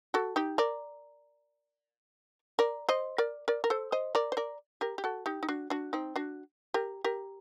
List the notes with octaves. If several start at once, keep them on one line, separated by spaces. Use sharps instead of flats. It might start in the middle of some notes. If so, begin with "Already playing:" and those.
F#4 A4
D#4 G4
A#4 D5
A#4 D5
C5 D#5
A#4 D5
A#4 D5
A#4
A4 C5
C5 D#5
A#4 D5
C5
A#4 D5
G4 A#4
G4
F#4 A4
D#4 G4
D#4
D4 F#4
D4 F#4
C4 D#4
D4 F#4
G4 A#4
G4 A#4